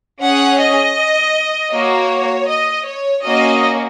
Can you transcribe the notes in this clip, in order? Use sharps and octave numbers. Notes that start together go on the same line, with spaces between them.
C#4 G#4 F#5
D#5
A#3 F#4 C#5
D#5
C#5
A#3 C#4 F#4 D#5